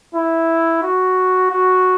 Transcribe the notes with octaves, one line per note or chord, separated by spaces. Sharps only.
E4
F#4
F#4